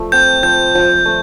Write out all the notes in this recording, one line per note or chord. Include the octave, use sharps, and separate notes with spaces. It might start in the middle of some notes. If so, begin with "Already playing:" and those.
Already playing: F3 A3
C4 G6
F3 G6
F3
A3